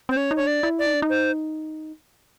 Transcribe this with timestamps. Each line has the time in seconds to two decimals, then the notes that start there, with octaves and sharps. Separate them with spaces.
0.09 C4 C5
0.16 C#4 C#5
0.31 D#4
0.36 D4 C#5
0.47 D5
0.63 E4
0.79 D5
0.87 D#4
0.94 D4
1.02 D#4
1.09 C5